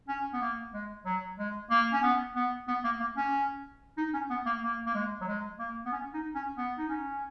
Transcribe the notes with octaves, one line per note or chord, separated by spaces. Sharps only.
C#4
B3
A#3
G#3
F#3
G#3
A#3
C#4
B3
B3
B3
A#3
A#3
C#4
D#4
C#4
B3
A#3
A#3
A#3
G#3
F#3
G#3
A#3
B3
C#4
D#4
C#4
B3
D#4
C#4